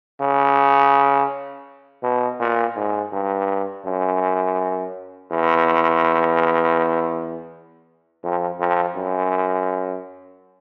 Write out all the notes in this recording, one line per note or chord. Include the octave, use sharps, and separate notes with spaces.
C#3
B2
A#2
G#2
G2
F#2
E2
F2
F2
F#2